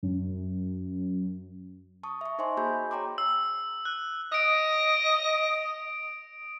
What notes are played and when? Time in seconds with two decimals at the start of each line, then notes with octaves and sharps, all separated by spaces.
0.03 F#2
2.03 A5 C#6 D#6
2.21 E5 C#6
2.38 D#4 C5 D#5 E5 G#5 C6
2.57 A#3 F#4 G#4 G#5 B5 G6
2.91 C#5 G5 A#5 C6 D6
3.18 E6
3.85 F#6
4.32 D#5 D#6 A#6 D7